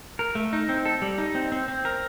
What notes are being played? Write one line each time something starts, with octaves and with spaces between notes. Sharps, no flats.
A#4
A3
D#4
C4
A4
G3
D#4
C4
C4
C4
A#4